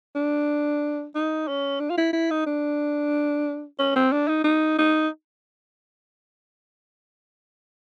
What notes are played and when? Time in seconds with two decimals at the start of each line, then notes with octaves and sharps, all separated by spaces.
0.16 D4
1.15 D#4
1.48 C#4
1.80 D4
1.90 F4
1.97 E4
2.13 E4
2.31 D#4
2.46 D4
3.79 C#4
3.96 C4
4.12 D4
4.28 D#4
4.44 D#4
4.78 D#4